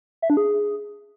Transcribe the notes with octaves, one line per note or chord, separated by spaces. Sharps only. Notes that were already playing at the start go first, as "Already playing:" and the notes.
E5
D4
G#4